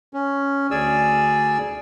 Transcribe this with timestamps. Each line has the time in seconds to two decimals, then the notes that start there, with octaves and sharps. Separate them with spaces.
0.14 C#4
0.71 D2 G#4 D5 G#5 E6